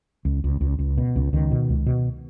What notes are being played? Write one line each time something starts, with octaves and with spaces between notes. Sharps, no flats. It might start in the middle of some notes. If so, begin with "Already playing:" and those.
C#2
C#2
C#2
C#2
B2
C#2
C#2 D#3
B2
C#2
B2